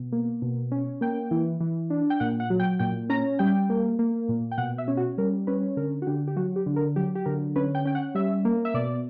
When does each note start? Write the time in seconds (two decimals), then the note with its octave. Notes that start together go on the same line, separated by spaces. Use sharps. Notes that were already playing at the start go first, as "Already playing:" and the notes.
Already playing: B2
0.12 A#3
0.42 B2
0.72 C#4
1.01 A#3 G5
1.31 E3
1.60 E3
1.90 D4
2.10 G5
2.20 A#2 F#5
2.40 F#5
2.50 F#3
2.60 G5
2.79 A#2 G5
3.09 C#4 A#5
3.39 G3 G5
3.70 A#3
3.99 A#3
4.29 A#2
4.51 G5
4.58 B2 F#5
4.78 E5
4.88 C#4
4.97 F#4
5.18 G3 A#4
5.47 C#4 B4
5.77 D3 A#4
6.02 F#4
6.07 D3 G4
6.27 G4
6.36 F#3 F#4
6.56 G4
6.66 D3
6.76 A#4
6.96 F#3 G4
7.15 G4
7.26 D3 A#4
7.56 C#4 B4
7.75 G5
7.85 C#4 G5
7.95 F#5
8.15 G3 E5
8.45 A#3
8.65 E5
8.74 B2 D5